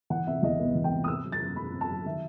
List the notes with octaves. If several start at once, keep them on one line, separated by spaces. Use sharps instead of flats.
E3 F#5
C3 E5
E2 D#5
B3
E3
G5
C3
D#6
C4 E6
F#3
A6
F#2
F#2 B5
C4
A5
F#3
D#3 E5